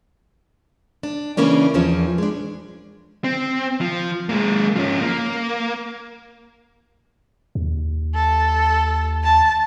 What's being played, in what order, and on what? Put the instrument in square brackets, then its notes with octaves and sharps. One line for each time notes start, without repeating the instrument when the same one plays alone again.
[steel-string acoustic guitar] D4
C#3 E3 A#3 C#4 D4
E2 E3 F3 C#4
G#3 D4
[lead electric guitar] C4
F3
G#3 A#3
F3 C#4
A#3
[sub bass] D#2
[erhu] A4
A5